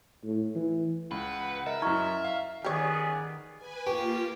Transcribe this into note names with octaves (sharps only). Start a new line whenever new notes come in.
A2
E3
C#2 B4 F#5
A#4 D#5 E5
F#2 E4 F#4 A#5 C#6 F6 G#6
F5
D#3 B3 C#4 G4 G#4 C#5 D5
B4 G#5
A#3 F4 G4 B4 C#6